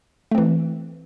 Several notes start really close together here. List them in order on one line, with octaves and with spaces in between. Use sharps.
A3 C4 E3